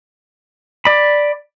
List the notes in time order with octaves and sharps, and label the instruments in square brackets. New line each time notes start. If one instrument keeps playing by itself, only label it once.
[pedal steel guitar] D5 B5